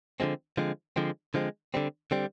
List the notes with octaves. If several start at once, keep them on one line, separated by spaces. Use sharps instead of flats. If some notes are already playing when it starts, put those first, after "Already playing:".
D3 F3 G#3 C4
D3 F3 G#3 C4
D3 F3 G#3 C4
D3 F3 G#3 C4
D3 G3 C4
D3 G3 C4